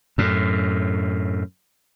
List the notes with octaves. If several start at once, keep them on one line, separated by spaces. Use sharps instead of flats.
F#2 A2